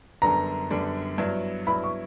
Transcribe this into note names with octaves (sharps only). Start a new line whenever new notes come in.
F#2 D3 G3 B3 D4 A#5
F#2 D3 G3 B3 D4
G2 F#3 B3 E4
G2 F#3 B3 E4 B5
C#6